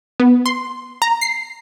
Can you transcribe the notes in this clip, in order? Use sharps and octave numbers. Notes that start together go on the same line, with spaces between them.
B3
C6
A#5
C7